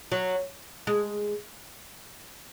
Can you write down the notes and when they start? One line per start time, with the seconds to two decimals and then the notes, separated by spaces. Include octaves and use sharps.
0.12 F#3
0.87 G#3